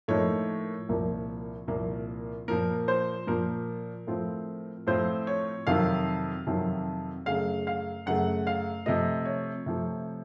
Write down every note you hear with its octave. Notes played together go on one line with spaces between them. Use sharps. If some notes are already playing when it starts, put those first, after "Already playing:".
A2 F3 A#3 D#4 C#5
C2 A#2 F3 A#3
C2 A#2 F3 A#3
A#2 F3 A#3 A#4
C5
A#2 F3 A#3 A#4
A2 F3 C4 F4
A2 F3 C4 F4 C5
C#5
F2 C3 D#3 F#3 F5
F2 C3 D#3 F#3
F#2 C#3 A3 F5
F5
F#2 C#3 A3 F#5
F5
C3 F3 A3 D#5
C#5
C3 F3 A3